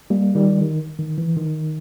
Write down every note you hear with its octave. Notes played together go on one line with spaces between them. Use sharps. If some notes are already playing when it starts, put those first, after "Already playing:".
G3 A#3
D#3 G3
D#3
D#3
E3
D#3